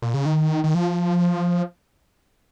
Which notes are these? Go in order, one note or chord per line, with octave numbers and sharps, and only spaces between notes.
A#2
C#3
D#3
D#3
F3